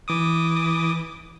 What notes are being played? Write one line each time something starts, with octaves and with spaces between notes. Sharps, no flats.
E3 D6 D#6